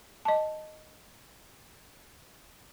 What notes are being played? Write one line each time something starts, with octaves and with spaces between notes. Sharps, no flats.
D#5 A5